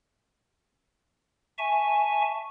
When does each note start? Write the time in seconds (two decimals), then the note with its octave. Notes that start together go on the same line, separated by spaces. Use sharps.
1.58 E5 G#5 A5 C#6